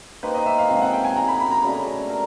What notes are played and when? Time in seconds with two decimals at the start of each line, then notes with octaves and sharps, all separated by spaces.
0.23 A#3 D#4 G4 B4 C5
0.34 D#5
0.46 E5
0.58 F5
0.69 C3 F3 G#3 C#4 F5
0.81 F#5
0.93 G5
1.05 G#5
1.16 F#3 A#3 D#4 G#4 A#5
1.28 B5
1.40 B5
1.51 A#5
1.64 C#3 F#3 A3 D4
2.10 A#4